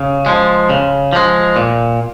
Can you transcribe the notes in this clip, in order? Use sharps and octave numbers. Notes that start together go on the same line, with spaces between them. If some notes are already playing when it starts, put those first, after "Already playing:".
Already playing: C#3
F3 G#3
C#3
F3 G#3
A#2